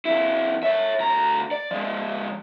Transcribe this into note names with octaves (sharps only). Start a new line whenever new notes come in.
F2 E4
C#5 E5
D2 A#5
D5
F3 G#3